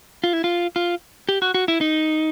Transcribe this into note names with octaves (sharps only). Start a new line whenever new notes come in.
F4
E4
F4
F4
G4
F#4
F#4
E4
D#4